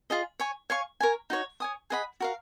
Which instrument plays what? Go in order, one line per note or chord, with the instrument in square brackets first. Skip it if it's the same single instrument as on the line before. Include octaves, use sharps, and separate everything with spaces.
[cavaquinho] F4 G#4 D#5
C#5 G#5 C#6
C#5 F5 G#5 C#6
A#4 C#5 G#5
D#4 F#4 C#5
C#5 G#5 D#6
G#4 D#5 F#5 B5
F#4 A#4 F5